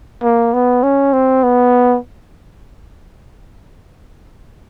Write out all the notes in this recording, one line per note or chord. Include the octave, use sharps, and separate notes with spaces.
A#3
B3
C#4
C4
B3